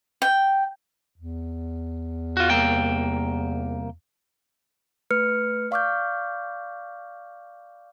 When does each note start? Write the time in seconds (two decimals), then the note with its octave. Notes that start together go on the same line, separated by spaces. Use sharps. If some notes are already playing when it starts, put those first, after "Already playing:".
0.22 G5
1.16 E2
2.37 F4 F#4
2.50 C2 A#3 G5
5.11 A3 B4 F6 C#7
5.71 D5 F5 C#6 D6 F6 G6